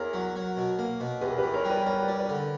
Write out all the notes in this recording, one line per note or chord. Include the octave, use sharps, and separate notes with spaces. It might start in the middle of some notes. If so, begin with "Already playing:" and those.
Already playing: E2 A#4 C#5
F#3
F#3
B2
A#3
B2
E2 G4 B4
A#4
G4 B4
E2
A#4 C#5
G3
B4 D5
G3 A#4 C#5
B4 D5
G3
B4 D5
D3